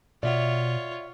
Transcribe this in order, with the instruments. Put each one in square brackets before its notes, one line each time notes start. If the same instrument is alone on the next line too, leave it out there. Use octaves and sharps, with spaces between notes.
[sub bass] B2 [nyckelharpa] F4 C#5 [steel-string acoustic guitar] D5 E5 F#5